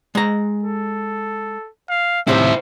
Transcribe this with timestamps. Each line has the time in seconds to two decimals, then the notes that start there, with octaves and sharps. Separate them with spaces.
0.15 G#3 A#5
0.63 A4
1.90 F5
2.27 D#2 A2 C3 E4 C5 E5